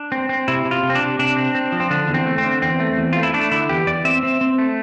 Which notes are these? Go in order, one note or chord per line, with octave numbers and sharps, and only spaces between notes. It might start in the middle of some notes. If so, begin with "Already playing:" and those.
Already playing: D4
C4
C4
C3 E4
C3
F4
C3
C4
D4
C3
C3 D4
C4
C4
F3
C4
D3 D4
E2
C4
A3
C4
D3
E2 C4
A3
E2
A3 F4
E4
A3 D4
D3 E4
E2 G4
E2 D5
C4 E5
C4
C4
A3